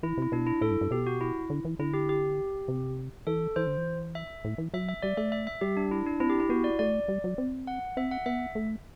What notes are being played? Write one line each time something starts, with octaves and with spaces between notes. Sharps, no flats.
E3 E4
C3 E4
B2 D4
E4
A2 A4
G2
G2
B2 G4
F#4
E4
D3
E3
D3 E4
G4
G4
C3
E3 A4
E3 C5
D3
E3
E5
A2
E3
F#3 E5
E5
G3 D5
A3 E5
E5
E5
G3 G4
D4
E4
D4
C4 E4
G4
E4
B3 F#4
D5
A3 D5
G3
F#3
C4
F#5
C4 E5
F#5
B3 E5
A3